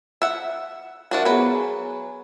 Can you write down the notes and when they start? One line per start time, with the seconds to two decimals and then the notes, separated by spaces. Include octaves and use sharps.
0.22 E5 F#5
1.11 F3 D4 F#4 A#4 E5 F#5
1.25 F#3 B3 G#4 B4
1.55 G#5